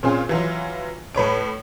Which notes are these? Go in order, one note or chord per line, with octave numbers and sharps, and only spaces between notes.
A#2 C4 C#4 F4 G#4
E3 F#3 F4
A2 B4 C#5 D7